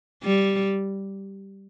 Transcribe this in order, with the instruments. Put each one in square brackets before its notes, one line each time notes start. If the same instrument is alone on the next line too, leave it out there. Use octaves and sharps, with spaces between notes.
[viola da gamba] G3